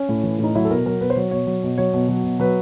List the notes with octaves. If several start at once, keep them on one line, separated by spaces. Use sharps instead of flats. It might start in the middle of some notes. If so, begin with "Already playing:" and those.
Already playing: C#4
A2
E3
A2 D#4
F#3 E4
A4
B2 A#4
F#3 A#4
B2 B4
C5
F#3 C#5
B2 C#5
F#3
B2
F#3 C#5
B2
F#3
B2
F#3 B4